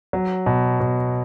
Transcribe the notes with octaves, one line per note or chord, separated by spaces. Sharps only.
F#3
B2
B2